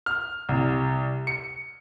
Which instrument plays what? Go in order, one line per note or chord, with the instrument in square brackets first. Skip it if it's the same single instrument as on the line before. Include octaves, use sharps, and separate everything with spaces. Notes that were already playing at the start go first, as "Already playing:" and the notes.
[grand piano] F6
C2
C#7